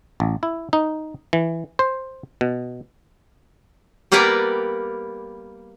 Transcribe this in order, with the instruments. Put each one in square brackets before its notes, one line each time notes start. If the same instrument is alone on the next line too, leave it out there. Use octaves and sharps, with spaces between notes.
[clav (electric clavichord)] A1
E4
D#4
E3
C5
B2
[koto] G3 A#3 B3 A#4 B4 D5